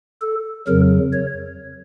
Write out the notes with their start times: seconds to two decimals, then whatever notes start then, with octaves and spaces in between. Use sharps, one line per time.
0.21 A4
0.67 F2 C#3 F#3 A#4
1.12 C#5